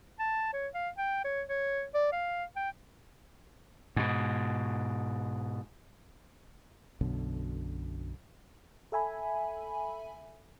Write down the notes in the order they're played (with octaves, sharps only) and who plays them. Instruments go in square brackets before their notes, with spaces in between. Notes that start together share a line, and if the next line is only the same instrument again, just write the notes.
[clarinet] A5
C#5
F5
G5
C#5
C#5
D5
F5
G5
[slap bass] G#2 B2
[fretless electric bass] B1 F#2 B2 D3
[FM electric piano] A4 E5 G#5 B5